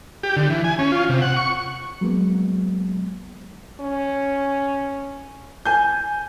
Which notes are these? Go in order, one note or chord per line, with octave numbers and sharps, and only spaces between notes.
G4
D3
E3
G#5
C#4
F4
C3
F#5
C#6
F#3 G#3 A#3 B3
C#4
G#5 G6